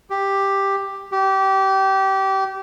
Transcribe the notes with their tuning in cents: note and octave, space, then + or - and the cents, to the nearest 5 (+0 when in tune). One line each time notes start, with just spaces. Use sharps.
G4 +5
G4 -25